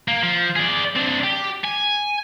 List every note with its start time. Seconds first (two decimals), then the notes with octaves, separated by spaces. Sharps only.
0.08 A#3
0.23 F3
0.56 G#4 D5
0.96 C4 D4
1.23 G4
1.64 G#5